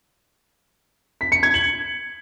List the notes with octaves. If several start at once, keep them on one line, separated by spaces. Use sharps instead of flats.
B6
C#7
G#6
F#7